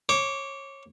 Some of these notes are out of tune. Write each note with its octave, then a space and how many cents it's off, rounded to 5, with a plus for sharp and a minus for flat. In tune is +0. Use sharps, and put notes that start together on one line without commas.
C#5 -25 D6 -20